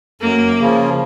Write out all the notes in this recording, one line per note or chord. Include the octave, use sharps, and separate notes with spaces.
F#2 A#3
C#3 F3